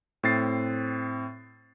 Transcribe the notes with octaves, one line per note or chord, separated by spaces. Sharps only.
A2 C4 A6 C7